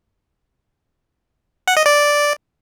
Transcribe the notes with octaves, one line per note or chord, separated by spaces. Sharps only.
F#5
D#5
D5